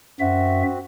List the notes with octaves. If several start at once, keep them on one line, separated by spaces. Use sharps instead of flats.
F#2 C4 F#4 E5